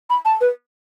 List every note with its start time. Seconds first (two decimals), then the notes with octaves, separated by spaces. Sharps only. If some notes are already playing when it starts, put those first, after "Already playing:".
0.10 B5
0.25 A5
0.41 B4